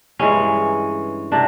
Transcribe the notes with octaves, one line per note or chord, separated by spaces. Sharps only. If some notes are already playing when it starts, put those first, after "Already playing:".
G2 E3 G#3 C#4
C3 D4